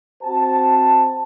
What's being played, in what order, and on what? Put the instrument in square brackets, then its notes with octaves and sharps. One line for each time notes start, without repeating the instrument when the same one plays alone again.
[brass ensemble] C4 F#4 C5 A5